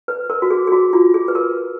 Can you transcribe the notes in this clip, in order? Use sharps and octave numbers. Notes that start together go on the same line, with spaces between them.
B4
A#4
F#4
G#4
G#4
F#4
F4
G#4
B4
A#4